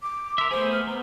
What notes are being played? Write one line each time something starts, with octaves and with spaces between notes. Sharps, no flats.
D6
A#4 E5 C6
A3 B3 G#4 C5
F6
B3 A#5